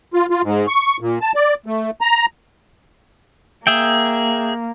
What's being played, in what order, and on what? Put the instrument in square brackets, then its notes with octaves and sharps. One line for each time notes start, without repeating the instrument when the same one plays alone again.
[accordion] F4
F4
G#2
C#6
A#2
A5
D5
A3
A#5
[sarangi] A#3 [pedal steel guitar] G#4 E5 G5